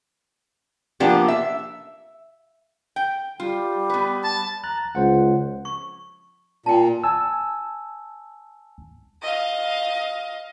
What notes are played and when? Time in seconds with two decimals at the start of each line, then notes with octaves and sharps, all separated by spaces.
1.00 F3 A#3 B3 D4 G4
1.28 E5
2.96 G5
3.40 G3 F4
3.90 B3 B4
4.24 A5
4.64 A#5 F#6 A6
4.95 C#2 C#3 C5 F#5
5.65 C#6
6.66 A#2 G5 A5
7.04 G#5 A5 E6
9.22 D#5 F5